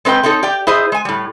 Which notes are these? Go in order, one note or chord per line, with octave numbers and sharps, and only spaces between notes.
G#3 C4 B4 D#5 G5
A3 C4 D#4 A4 C#5
G4 D5 G5
E4 G#4 C5 D#5
G#3 G#5
A2 G3